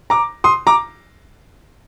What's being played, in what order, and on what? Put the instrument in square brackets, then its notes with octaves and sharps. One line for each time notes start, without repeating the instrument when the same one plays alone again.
[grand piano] A#5 D6
C6 D#6
A#5 D6